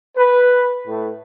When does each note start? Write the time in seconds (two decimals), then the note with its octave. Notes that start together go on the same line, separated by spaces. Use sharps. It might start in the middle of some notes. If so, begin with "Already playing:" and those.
0.16 B4
0.87 A2